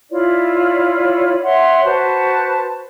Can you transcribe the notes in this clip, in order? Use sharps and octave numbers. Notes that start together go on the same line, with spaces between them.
E4 F4 C#5 D5
C#5 E5 F#5 C6
F#4 B4 C5 A5